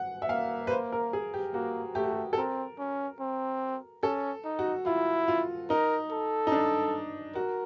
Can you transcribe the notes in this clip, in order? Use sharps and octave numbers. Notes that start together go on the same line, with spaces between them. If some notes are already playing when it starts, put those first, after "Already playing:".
Already playing: F#5
E5
A#3 F5
B4
C5
A#4
G#4
G4
A#3 F#4
A3 G4
F#4
G4
A4
C4 A#4
C#4
C4
C#4 A4
D#4
F#4
E4 F4
F4
D#4 A#4
A4
D#4
D4
F#4 A#4